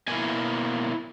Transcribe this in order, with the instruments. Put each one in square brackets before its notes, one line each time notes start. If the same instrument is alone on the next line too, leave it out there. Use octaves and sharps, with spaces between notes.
[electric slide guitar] B2 A#3 E4 G#5